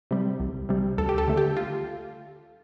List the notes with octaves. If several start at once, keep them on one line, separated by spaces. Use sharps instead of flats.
C3 G3
C2
C3 G3
D2 A4
G4
A4
D3 A3
G4
F4